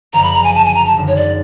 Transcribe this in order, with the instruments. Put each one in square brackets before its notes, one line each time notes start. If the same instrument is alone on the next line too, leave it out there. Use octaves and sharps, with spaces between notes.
[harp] F#1 F#2 D3 F3 [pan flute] A#5
[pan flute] B5
A#5
G#5
A5
G#5
A#5
A5
[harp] G#1 F#2 D3
[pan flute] C#5
D5